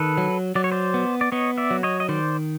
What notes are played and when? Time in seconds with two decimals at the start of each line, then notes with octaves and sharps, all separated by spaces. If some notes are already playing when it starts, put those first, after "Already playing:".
Already playing: D#3 A4 B4
0.18 F#3
0.55 F#3 D5
0.64 C#5
0.72 C5 D5
0.94 B3
1.21 D5
1.32 B3 C#5 D#5
1.58 D5 E5
1.71 F#3
1.83 C#5 D#5
2.00 D#5
2.09 D#3 C5 D5